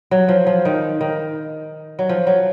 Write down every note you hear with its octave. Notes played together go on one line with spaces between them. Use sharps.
F#3
F3
F3
D#3
D#3
F#3
F3
F#3